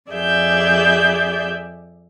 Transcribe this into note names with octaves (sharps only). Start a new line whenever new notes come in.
F2 G#4 D5 E5 G6